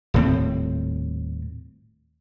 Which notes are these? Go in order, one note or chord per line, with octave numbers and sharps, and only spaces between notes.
D#1 A2 C4